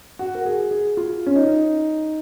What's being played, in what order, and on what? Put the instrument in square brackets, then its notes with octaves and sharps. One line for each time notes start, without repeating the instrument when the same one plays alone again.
[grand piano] F#4
A#4
G#4
G#4
F4
C#4
D#4